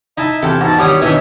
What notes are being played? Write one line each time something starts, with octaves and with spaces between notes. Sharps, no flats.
D#4 E4 E5 A5
E2 C3 E4 F4 A4 G5
G#2 F#4 A5
D#3 G3 C#5 F#5 D#6
B2 D#3 E3 D4 C#5 D#5 E5